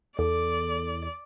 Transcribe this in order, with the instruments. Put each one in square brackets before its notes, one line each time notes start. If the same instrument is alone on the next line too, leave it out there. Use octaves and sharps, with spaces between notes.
[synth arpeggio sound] E2 [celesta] A4 [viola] D5